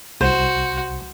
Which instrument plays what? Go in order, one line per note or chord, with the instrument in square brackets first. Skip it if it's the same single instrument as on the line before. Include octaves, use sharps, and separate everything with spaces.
[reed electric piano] C2 [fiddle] F#4 [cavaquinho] C5